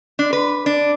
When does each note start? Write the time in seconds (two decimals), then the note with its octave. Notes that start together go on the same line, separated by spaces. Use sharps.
0.19 D4
0.33 B4
0.66 D4